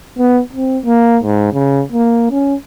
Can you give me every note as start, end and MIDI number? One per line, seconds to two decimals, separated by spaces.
0.18 0.41 59
0.53 0.78 60
0.85 1.17 58
1.23 1.48 44
1.53 1.82 49
1.92 2.26 58
2.31 2.55 61